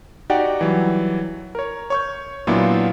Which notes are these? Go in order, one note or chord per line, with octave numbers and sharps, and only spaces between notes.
D#4 F#4 G4 D5 F#5 G5
E3 F#3 G3
A#4 C#5
C#5 C#6 G6
A#2 F#3 B3 D4 E4 F4